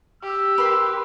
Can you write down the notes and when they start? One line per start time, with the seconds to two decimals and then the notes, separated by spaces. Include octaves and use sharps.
0.23 G4 E6
0.58 A#4 B4 C6